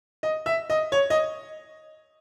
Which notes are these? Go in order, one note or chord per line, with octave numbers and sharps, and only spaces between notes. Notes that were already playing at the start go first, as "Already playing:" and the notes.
D#5
E5
D#5
C#5
D#5